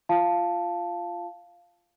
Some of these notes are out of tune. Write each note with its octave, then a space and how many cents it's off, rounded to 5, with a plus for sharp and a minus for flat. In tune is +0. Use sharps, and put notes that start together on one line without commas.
F4 -15 F5 +0 A5 +0